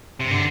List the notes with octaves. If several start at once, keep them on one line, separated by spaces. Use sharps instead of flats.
G2 C3
D3